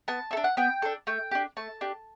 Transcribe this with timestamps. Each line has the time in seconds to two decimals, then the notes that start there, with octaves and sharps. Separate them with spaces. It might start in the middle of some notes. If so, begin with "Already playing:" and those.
0.08 B3 A5
0.31 A4 E5
0.37 D4
0.44 F#5
0.57 B3 G5
0.82 D4 A4
1.07 A3 G5
1.31 D4 G4
1.57 A3 A5
1.81 D4 G4